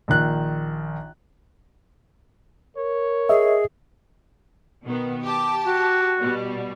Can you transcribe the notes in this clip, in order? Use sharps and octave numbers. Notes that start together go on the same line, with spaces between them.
A#1 D#3 F#6
A#4 C#5
G#4 D#5 E5
B2 D#3 B3
G4 A5 D6
F#4
B2 G3